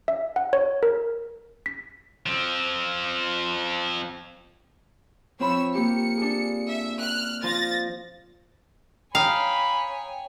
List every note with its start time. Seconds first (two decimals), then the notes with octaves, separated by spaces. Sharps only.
0.08 E5
0.36 F#5
0.53 C#5
0.83 A#4
1.66 B6
2.26 F3 C4
5.40 F3 C4 F4 C#5 B5 E6
5.75 A#3 G4 C#7
6.18 D4 G#4
6.70 E5
7.00 F6 F#6
7.43 F3 F4 A6 A#6
9.15 C#5 F5 G5 G#5 A#5 B5 D#6